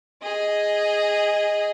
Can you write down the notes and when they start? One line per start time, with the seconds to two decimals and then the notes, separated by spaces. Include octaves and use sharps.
0.22 G#4 D#5